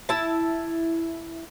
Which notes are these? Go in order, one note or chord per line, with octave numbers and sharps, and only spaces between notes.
E4 A5